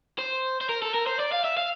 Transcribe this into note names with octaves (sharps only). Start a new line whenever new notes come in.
C5
C5
A#4
A4
A#4
C5
D5
F5
E5
F5